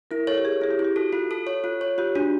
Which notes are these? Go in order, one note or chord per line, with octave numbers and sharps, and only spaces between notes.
E4 A#4
A4 C#5
G4
G#4 C#5
E4 G#4
G4
E4
G4
F#4 A4
F4
A4
C#5
F4
C#5
F4 G4
D4 F#4